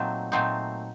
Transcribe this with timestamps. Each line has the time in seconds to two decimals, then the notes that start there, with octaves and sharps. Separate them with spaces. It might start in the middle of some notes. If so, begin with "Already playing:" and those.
Already playing: A#2 F#3 A3 C4 D#4
0.32 A#2 F#3 A3 C4 D#4